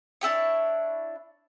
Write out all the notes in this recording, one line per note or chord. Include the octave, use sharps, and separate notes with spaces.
D4 E4 G4 C#5